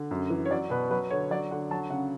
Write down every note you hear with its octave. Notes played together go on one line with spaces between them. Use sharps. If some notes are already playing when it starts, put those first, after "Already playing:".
Already playing: D3
F#2
E3
C#5
F#3 D5
B2 B4
F#3 B4
D3 C#5
F#3 D5
D3 F#5
F#3 A5
C#3 F#5